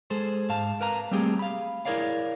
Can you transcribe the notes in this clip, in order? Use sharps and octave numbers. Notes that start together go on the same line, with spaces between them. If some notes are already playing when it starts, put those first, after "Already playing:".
G#3 G#4 A4 C5
G#2 F5 A5
A#4 B4 F5 A#5
G3 A3 A#3 C4 G4 G#4
F5 B5
E4 G#4 A#4 C#5 D5 F5